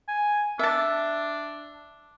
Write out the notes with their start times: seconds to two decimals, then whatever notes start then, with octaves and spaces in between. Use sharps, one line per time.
0.08 G#5
0.59 D4 E5 A5